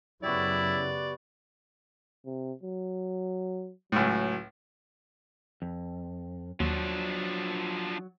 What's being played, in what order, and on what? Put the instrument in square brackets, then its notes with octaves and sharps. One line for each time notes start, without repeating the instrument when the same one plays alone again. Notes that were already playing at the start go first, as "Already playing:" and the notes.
[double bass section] F#2 C#3 [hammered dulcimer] B3 F#4 G4 [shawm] E4 [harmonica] D5
[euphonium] C3
F#3
[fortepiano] C#2 A2 [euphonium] F#3
[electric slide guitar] F2
[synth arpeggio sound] D#2 [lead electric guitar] F3 D4 [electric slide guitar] F#3